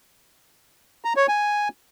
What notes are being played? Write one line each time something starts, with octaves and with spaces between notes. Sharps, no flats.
A#5
C#5
G#5